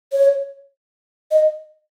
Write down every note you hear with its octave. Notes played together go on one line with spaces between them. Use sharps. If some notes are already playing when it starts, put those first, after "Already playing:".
C#5
D#5